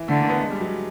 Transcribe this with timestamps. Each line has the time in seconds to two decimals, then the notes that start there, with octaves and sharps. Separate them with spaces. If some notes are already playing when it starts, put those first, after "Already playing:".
Already playing: E3
0.08 D3 A3
0.20 A#3
0.30 B3
0.40 G#3
0.51 G3
0.61 F#3